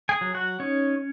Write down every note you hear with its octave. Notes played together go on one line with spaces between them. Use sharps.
G#4 G#5
F#3
F#4 F#5
C#4 D#4 C#5